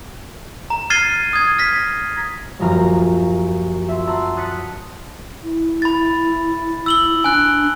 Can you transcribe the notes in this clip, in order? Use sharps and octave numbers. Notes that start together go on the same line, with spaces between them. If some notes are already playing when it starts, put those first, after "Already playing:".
A#5
F6 G#6 A6 C7 D#7 G7
D#6 G#6
F6 A#6 B6
D#1 F#2 F3 A#5 F6 A#6
E5 C6
F#5 A5 A#5 C6 E6
D#6 F#6 A6 B6 C#7
E4
B5 A6
E6 F#7 G7
D4 G#5 F#6